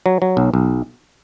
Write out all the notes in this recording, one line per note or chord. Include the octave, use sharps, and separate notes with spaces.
F#3
F#3
B1
B1